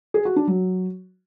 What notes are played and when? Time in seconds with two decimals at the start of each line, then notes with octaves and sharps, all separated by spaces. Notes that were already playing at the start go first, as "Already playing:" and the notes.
0.14 G#4
0.25 F#4
0.36 D4
0.47 F#3